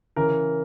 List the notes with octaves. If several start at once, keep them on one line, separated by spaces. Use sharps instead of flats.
C#3 E3 A#4